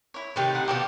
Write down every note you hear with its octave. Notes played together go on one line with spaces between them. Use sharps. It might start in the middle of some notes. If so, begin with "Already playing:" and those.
E4 C#5
C3 D#3 A3 G4 B4 C#5
D#4 F#5 C6
B2 F3 G4 A4 D5